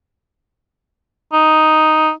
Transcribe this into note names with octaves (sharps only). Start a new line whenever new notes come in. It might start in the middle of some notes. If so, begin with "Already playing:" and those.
D#4